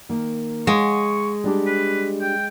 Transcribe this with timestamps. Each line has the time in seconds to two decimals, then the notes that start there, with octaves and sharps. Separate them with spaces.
0.09 D#3 A#3
0.67 G#3 C#5 F5 F#5 C#6
1.44 G3 D4 G4
1.66 B4
2.21 G5